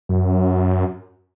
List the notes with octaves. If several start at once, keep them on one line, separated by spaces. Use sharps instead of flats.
F#2